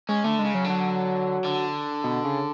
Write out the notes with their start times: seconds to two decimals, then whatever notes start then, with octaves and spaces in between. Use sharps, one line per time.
0.09 G#3 C#4
0.24 D3 A3
0.39 G#3
0.44 C#3
0.54 F#3
0.64 D3
0.70 F#3
1.44 D3
2.04 B2
2.25 C#3